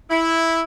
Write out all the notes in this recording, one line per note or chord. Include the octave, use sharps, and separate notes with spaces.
E4